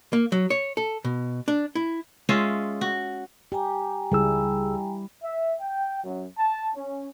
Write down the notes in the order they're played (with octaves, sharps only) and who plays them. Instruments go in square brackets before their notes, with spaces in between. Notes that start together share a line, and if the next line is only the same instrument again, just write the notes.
[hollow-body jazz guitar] A#3
F#3
C#5
A4
B2
D4
E4
[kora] G#3 C#4 F4 E5
F#4
[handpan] G4 [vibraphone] G5 G#5 A#5
[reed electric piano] C#2 G#4 E6 [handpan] G3 E4
[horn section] E5
G5
F#2
A5
C#4